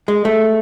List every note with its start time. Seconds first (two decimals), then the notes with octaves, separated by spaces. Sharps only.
0.08 G#3
0.25 A3